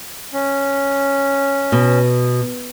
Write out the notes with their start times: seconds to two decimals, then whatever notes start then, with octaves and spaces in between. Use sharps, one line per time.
0.33 C#4
1.72 B2